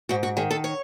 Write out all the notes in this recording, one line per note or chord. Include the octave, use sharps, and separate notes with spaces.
G#2 F#4
F#4
D#3 G#4
A4
C#5